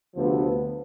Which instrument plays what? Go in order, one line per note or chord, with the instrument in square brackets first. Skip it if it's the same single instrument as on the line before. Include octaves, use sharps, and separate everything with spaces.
[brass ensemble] D2 C3 F3 B3